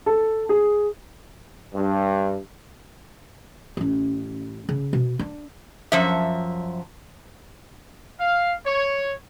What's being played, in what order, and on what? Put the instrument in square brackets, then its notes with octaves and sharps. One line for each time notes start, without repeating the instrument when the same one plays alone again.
[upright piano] A4
G#4
[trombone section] G2
[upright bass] A1 C#4
C#3
B2
D4
[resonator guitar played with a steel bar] F#2 F3 E5
[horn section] F5
C#5